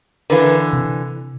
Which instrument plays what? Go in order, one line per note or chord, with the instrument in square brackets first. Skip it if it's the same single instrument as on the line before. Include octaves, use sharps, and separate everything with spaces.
[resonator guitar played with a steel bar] D3 E3 [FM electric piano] A#4 B4 F5
[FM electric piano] C3